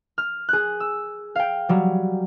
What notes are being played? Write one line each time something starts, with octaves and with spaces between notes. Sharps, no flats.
F6
G#4 F#6
E6
F5 G5
F#3 G3